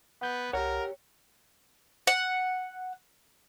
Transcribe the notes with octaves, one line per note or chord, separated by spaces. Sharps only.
B3 F#5 G6
C2 G4 A#4 C#5 F#5
F#5